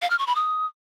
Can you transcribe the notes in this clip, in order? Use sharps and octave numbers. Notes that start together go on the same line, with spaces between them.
F5
F6
C#6
B5
D#6